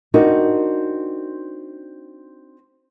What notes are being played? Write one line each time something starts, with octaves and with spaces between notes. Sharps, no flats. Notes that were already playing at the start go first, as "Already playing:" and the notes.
C4 D4 D#4 F#4 A#4